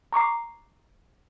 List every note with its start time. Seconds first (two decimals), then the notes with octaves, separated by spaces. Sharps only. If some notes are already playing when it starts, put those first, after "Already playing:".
0.12 A#5 C#6 D6 C7